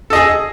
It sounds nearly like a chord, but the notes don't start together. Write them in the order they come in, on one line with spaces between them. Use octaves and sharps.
A4 D#5 G#4